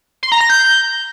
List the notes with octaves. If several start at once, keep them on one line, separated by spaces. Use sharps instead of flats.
C6
A#5
A#6
G6